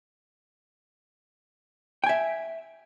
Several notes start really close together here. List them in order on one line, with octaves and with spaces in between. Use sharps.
G5 G#5 E5